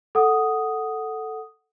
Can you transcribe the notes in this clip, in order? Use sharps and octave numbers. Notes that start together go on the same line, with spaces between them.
A4 F#5 D#6